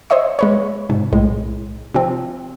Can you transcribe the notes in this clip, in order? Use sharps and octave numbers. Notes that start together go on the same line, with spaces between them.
C5 C#5 D#5 E5 C#6
G#3 B4 C#5
G#2 C3
B1 A2 G#3
C3 F3 C4